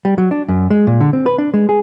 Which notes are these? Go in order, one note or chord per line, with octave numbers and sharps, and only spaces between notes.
G3
F#3
D4
F#2
G#3
A#2
D3
C4
B4
D4
G#3
G#4